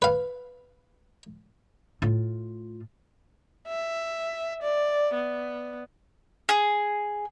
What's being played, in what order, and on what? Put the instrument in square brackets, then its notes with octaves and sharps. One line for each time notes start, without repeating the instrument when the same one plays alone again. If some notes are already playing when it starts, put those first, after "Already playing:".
[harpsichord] B4 F5
[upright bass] A2 F4
[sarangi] E5
D5
B3
[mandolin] G#4